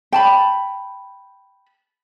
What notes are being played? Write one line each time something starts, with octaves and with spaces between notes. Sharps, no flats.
G5 A5 B5